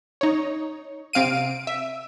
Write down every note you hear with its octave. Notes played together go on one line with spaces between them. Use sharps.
D#4 C#5
C3 C4 F5 D7 D#7
E5